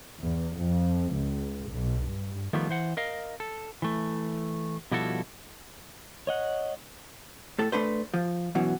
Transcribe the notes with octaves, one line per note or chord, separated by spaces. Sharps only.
E2
F2
C#2
B1
G2
D#3 F3 G3 A3 B3
E3 C5 F#5
A#4 D#5 F5
A4
E3 A3
B2 F3 G3 E4 F#4 A4
C#5 D#5 F#5
A2 A4
A3 D4 B4 C5
F3
F#2 B2 E3 F#3